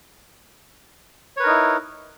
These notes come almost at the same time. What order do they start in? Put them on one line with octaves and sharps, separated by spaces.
C#5 B4 A#4 D#4 E4